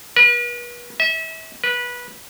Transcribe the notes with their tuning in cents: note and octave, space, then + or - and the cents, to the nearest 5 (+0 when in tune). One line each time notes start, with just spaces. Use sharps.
B4 -40
E5 -35
B4 -20